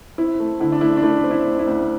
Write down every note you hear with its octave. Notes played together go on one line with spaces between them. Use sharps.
C4 E4
A3
D3 E4
D4
A3 E4
D4
A3 E4
C4
E4
D2
E4
D2